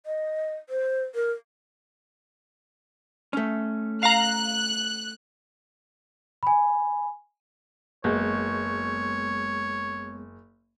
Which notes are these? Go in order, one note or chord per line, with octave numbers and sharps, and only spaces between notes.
D#5
C5
A#4
A3 C#4
F5 A#5 F#6
G#5 B5
F#1 G#3 B3 C#5